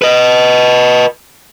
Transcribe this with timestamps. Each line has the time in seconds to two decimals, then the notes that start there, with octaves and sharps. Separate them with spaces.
0.02 B4 D#5